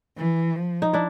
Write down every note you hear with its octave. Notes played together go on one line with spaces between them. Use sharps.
E3
F3
D#4
D4 E4